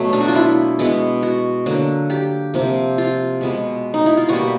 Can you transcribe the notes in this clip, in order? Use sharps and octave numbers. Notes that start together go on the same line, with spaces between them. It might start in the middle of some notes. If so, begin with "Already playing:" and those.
Already playing: B2 F#3 A3
D4
F#4
F4
E4
B2 G#3 B3
F#4
D3 F#3 A#3
G4
C3 F3 A#3
F4
B2 G#3 B3
D#4
E4
F4
B2 G3 A#3 F#4